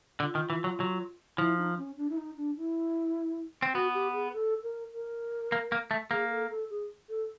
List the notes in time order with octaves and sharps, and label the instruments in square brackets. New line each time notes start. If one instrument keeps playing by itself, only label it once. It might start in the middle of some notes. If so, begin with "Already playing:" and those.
[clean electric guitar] D3 [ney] F4
[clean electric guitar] D#3
E3
F#3
F#3
[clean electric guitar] F3 [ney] E4
[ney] D#4
C#4
D4
E4
D#4
D4
E4
[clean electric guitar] C4
[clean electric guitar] B3 [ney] F#4
[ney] G4
G#4
A4
A#4
A#4
[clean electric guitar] A#3
A#3
A3
[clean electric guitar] A#3 [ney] G#4
[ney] A4
A4
G#4
A4